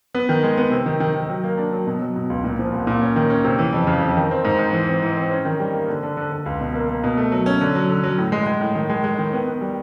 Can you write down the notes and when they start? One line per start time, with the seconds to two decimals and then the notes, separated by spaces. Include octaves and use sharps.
0.15 B3
0.29 D#3
0.43 G#3
0.57 B3
0.71 C3
0.86 D#3
1.00 D#3
1.14 D#3
1.29 F#3
1.44 A#3
1.58 D4
1.73 F#3
1.87 B2
2.01 F#3
2.16 B2
2.30 C#2
2.44 A#2
2.59 F3
2.72 C2
2.87 A#2
3.02 C#4
3.16 D#3
3.30 C#4
3.44 C3
3.59 E3
3.73 F2
3.87 C#3
4.02 F2
4.17 D#3
4.31 C4
4.45 G#2
4.59 G#2
4.73 E3
4.88 C4
5.02 E3
5.17 C4
5.31 C#4
5.45 D#3
5.60 G3
5.74 A#3
5.88 D3
6.03 D3
6.17 D3
6.32 D3
6.46 C#2
6.61 B2
6.75 A#3
6.89 A#3
7.04 B2
7.17 A3
7.32 F#3
7.46 C#4
7.61 D3
7.75 F#3
7.89 D3
8.04 F#3
8.18 A2
8.32 G#3
8.47 G#3
8.61 A2
8.75 D#3
8.90 G#3
9.04 G#3
9.19 D#3
9.33 B3
9.47 B3
9.61 G3